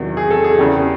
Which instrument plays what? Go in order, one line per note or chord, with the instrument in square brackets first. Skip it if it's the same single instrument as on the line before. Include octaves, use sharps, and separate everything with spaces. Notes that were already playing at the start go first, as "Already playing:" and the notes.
Already playing: [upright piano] E2 C3 D#3 F#3
G#4
A4
G#4
E2 C#3 E3 G4